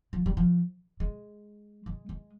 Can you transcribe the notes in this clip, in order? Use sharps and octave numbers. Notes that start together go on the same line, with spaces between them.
F3
G3
F3
G#3
G#3
G#3